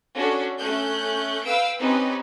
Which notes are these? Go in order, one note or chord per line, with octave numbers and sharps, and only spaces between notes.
C#4 D4 F#4 A4
A3 C#4 F#6 G6
B4 F5 G5 E6 D7
C4 C#4 D#4 G4 B4